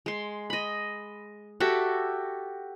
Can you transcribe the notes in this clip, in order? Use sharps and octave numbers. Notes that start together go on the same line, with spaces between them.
G#3 C6
D#5 B5
F#4 G4 A4 E5